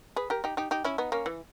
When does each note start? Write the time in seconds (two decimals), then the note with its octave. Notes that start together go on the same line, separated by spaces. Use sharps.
0.16 G#4 B4
0.30 G4 A#4
0.44 D#4 G4
0.57 D#4 G4
0.71 D#4 G4
0.84 C#4 E4
0.98 B3 D#4
1.12 A#3 C#4
1.26 E3